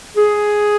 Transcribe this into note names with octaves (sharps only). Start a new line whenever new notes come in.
G#4